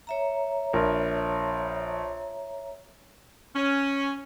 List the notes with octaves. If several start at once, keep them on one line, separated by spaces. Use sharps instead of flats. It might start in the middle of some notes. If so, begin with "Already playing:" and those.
C#5 E5 A#5
A#1 A#4
C#4